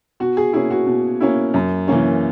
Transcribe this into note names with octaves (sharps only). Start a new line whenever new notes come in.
B2 F#4
G#4
A#3 C#4 E4 G#4
F#4
B2
A#3 C#4 E4
F#2
E3 A#3 C#4